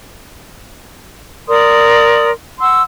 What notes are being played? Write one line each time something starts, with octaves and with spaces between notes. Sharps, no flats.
A#4 D5 C6 D#6
F#5 C6 E6